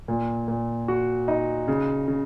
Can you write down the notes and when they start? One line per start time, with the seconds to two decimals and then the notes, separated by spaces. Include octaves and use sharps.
0.08 A#2
0.48 A#2
0.88 F#4
1.28 D#4
1.68 C#3
2.08 C#3